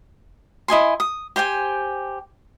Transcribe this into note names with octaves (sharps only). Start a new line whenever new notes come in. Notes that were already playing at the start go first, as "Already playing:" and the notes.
E4 D#5 G#5 C6
D#6
G4 C5 G5 G#5